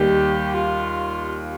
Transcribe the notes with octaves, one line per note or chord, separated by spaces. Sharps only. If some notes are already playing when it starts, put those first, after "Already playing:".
Already playing: D#2 D#3 G3 G4
F4